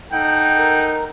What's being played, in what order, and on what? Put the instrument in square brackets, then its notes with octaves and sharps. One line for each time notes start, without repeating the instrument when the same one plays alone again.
[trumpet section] D#4 A4 F#5 [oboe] G5
[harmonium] A#4